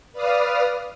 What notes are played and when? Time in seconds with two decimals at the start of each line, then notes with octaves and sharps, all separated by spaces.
0.13 B4 D5 F5 D#6 F6